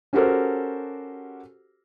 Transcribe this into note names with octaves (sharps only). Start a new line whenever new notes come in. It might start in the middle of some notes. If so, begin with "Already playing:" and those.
C#4 F#4 G4 A4 A#4 C5